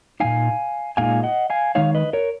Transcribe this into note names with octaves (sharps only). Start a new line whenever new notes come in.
A#2 G#3 D#4 F5 G#5
A#2 G#3 D#4 F5 G#5
D#5 F#5
F5 G#5
D#3 G#3 D#4 C#5 F5
B4 D#5
A#4 C#5